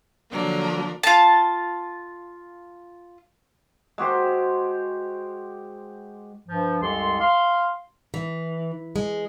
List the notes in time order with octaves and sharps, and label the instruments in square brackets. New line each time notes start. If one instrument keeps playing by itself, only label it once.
[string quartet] D3 F3 F#3 A#3 D4
[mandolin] F4 A5
[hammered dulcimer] G#3 F#4 G4 C5
[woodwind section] G2 F3
C2 F#2 G#3 G4 A4 C6
F5 C6
[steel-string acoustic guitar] E3
G#3